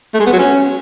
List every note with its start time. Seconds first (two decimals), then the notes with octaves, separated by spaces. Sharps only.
0.14 A3
0.20 G#3
0.26 B3
0.33 F#3
0.39 C#4